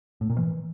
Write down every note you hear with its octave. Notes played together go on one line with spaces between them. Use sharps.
A2
A#2
E3